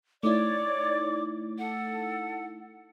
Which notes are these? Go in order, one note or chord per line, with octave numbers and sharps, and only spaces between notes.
A3 D#4 E4 C#5 D5 D6
A4 F#5